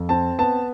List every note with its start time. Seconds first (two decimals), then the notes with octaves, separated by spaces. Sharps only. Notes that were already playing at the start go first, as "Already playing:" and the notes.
Already playing: F2
0.09 C4 A5
0.39 B3 A5